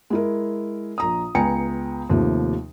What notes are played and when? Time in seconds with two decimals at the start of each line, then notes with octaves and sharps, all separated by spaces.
0.10 G#3 E4 A#4
0.98 A#1 A#5 D#6
1.35 C#2 B3 G5 G#5 A#5 C#7
2.10 D#2 C3 F3 A3